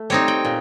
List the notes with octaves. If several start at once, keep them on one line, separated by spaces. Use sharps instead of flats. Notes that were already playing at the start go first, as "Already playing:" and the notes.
Already playing: A3
G3 C4 D#4 C#5
G5
A#2